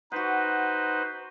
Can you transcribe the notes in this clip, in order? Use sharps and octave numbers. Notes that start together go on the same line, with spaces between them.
D#4 F#4 B4 C5 F#5